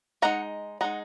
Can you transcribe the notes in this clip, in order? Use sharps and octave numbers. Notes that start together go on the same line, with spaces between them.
G#3 D#4 F#5 A#5
G#3 D#4 F#5 A#5